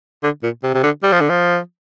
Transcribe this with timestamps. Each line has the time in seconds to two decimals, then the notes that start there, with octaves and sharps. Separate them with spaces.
0.23 D3
0.43 A#2
0.63 C3
0.74 C3
0.83 D3
1.03 G3
1.12 F3
1.20 D3
1.29 F3